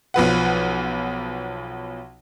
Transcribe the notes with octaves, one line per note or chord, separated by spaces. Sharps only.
B1 F3 B4 F#5